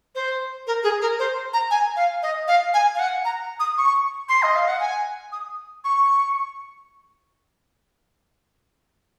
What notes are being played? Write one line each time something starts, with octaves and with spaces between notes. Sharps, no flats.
C5
A#4
G#4
A#4
C5
A#5
G#5
F5
D#5
F5
G#5
F5
F#5
A#5
D#6
C#6
C6
D#5
F5
F#5
G#5
D#6
C#6